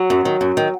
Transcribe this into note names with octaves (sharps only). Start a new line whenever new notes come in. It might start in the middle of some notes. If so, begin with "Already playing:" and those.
Already playing: F#3
F#2
D#3
F#2
D#3